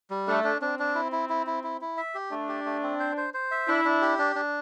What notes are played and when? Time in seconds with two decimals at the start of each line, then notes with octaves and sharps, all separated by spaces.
0.11 G3
0.27 A3 D4
0.44 D4
0.61 C4 D4
0.79 D4
0.95 E4
1.12 E4
1.29 E4
1.47 E4
1.64 E4
1.81 E4
1.97 E5
2.15 G4
2.31 A3 D4
2.49 G4
2.66 A3
2.83 C4
3.00 C5
3.17 C5
3.34 C5
3.51 E5
3.68 D4 E4
3.85 D4
4.02 G4
4.19 D4
4.36 D4